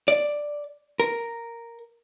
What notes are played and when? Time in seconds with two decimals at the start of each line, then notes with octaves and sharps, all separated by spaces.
0.08 D5
1.00 A#4